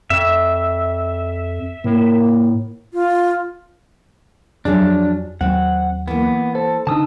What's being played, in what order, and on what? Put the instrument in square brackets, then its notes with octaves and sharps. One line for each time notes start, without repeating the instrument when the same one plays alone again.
[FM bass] F2 [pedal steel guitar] E5
[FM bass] A2 [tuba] A#3
[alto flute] F4
[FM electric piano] F2 [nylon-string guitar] F3 F#3 G#4 [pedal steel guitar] D4
[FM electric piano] D#2 F#3 [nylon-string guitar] C4 [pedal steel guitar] F#5
[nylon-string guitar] E3 A#3 [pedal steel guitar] B3
[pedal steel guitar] A4 [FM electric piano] C5
[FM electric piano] D3 D#4 [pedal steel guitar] A5 D#6 E6